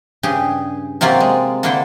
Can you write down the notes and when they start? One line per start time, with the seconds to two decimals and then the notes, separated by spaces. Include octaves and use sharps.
0.23 G2 C#3 G4 G#4
1.01 C3 F#3 A#3 F4 G4 D5
1.20 G#3
1.63 D3 A#3 D4 E4 C5 G5